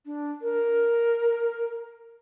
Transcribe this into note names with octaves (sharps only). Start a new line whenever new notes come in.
D4
A#4